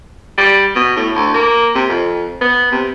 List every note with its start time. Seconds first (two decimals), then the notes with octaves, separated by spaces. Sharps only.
0.38 G3
0.75 B2
0.96 A2
1.15 D2
1.34 A#3
1.75 C3
1.89 F2
2.41 B3
2.72 C3